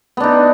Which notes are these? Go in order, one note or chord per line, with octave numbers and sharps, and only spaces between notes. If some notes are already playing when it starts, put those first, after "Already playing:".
B3 D4 D#4